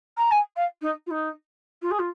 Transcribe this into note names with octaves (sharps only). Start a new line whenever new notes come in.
A#5
G#5
F5
D#4
F4
D#4
F4
G#4
F4